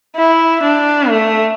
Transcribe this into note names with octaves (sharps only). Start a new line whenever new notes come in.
E4
D4
A3